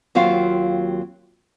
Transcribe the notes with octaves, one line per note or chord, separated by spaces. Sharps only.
D#2 F#3 C4 F4 F5